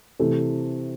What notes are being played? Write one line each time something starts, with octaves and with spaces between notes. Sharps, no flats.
C3 E3 A3